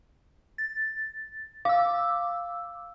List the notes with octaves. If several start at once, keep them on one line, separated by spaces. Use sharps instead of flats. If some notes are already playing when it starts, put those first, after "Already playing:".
A6
F5 D6 E6